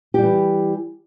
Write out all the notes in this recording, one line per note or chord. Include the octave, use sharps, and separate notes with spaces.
E3 G3 G4